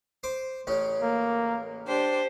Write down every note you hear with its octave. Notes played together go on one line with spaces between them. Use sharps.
C5 D6
A1 C#3 C#4
A#3
D4 G4 C5